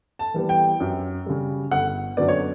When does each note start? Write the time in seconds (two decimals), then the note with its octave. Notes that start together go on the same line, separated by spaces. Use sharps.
0.19 A5
0.34 E3 G3 B3
0.49 G5
0.80 F#2
1.26 C#3 G3
1.71 G1 F#5
2.17 F#2 D3 F#3 B3 D5
2.28 C#5